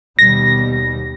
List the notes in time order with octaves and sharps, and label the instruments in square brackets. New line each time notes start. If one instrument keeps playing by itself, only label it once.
[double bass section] D#2 B2 G3 [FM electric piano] A#6